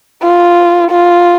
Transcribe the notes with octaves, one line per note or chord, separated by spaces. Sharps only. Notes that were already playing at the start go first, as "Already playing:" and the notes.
F4
F4